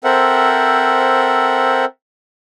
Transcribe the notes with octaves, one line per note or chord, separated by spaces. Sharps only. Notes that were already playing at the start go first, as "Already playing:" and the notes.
C4 A4 A#4 C5 E5 F#5